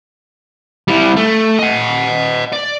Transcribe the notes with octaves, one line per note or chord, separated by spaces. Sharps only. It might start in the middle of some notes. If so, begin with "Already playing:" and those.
G3 E4
A3
D#5 F#5
D5